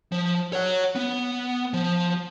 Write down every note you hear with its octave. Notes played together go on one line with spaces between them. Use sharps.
F3
C#5 F#5
B3
F3